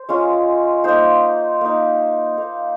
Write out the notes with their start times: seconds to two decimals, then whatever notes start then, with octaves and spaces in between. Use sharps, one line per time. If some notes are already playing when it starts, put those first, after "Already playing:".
Already playing: C5
0.09 G#3 C#4 F4
0.84 A#3 D#4 C5 C6
1.61 A#3 D#4
2.38 A#3 D#4